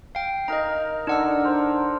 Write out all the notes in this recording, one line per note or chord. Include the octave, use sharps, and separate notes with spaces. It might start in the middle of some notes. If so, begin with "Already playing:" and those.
F5 G5
D#4 A#4 D#5 A#5
D3 D4 D#4 F#5 E6
A#4 C5